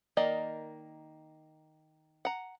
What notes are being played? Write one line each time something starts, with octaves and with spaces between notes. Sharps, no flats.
D#3 A#3 D5 D#5 A#5
F#5 A#5